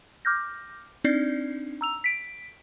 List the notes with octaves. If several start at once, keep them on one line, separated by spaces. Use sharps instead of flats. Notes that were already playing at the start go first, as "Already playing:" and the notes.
D6 F6 G6 A#6
C4 D4 D#4 D5 C7
A#5 E6 F7
B6 D7